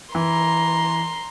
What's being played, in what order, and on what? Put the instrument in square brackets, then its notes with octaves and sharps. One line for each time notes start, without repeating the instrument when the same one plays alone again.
[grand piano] E3 [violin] A#5 C6